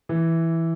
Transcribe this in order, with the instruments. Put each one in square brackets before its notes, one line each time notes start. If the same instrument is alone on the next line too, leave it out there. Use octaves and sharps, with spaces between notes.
[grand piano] E3